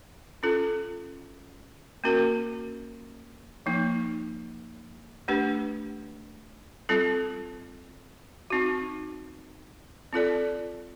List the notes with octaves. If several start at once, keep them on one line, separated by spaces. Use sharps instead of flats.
C#4 F4 A4
A#3 C#4 F#4 A#4
F3 A#3 D#4
A3 D4 G4 B4
G3 C4 F4 A4
C4 D#4 F#4
C4 F4 A4 D5